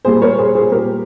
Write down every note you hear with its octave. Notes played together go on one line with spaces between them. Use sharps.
A#2 G3 G#4 C5
A#4 C#5
G#4 C5
G#4 C5
A#2 G3 G4 A#4